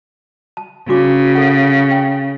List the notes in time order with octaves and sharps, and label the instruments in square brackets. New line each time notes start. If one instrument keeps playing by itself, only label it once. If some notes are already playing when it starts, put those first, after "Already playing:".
[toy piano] A5
[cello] C#3 [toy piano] D4 F#4 D6
[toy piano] A4 F#5
G5